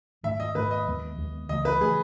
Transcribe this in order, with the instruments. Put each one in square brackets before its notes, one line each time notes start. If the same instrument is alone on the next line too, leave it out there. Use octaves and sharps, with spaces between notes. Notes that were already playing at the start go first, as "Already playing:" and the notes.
[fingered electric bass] G#2 D#3 A3 [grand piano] E5
[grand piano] D#5
[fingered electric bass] G#2 D#3 A3 [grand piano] B4
[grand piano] D#5
[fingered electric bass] D#2 D#3 G#3 B3
D#2 D#3 G#3 B3
[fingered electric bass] C#2 C#3 E3 A3 [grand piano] D#5
[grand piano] B4
[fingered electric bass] C#3 E3 A3 [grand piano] G#4